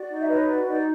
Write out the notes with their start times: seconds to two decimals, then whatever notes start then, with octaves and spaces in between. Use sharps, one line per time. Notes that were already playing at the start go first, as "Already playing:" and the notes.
Already playing: F#4 D5
0.10 D#4
0.20 E5
0.29 B4 C#5 D#5
0.47 F#4 D5
0.66 D#4 D5